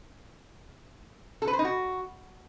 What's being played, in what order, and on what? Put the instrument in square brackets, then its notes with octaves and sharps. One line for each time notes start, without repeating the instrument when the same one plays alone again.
[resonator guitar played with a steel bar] A4
B4
C5
D#4
F#4